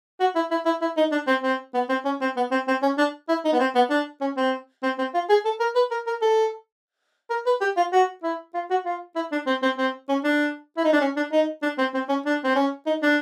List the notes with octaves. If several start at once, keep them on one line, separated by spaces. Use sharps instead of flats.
F#4
E4
E4
E4
E4
D#4
D4
C4
C4
B3
C4
C#4
C4
B3
C4
C4
C#4
D4
E4
D#4
B3
C4
B3
D4
C#4
C4
C4
C4
F4
G#4
A4
A#4
B4
A#4
A#4
A4
A#4
B4
G4
F4
F#4
E4
F4
F#4
F4
E4
D4
C4
C4
C4
C#4
D4
E4
D#4
D4
C#4
D4
D#4
D4
C4
C4
C#4
D4
C4
C#4
D#4
D4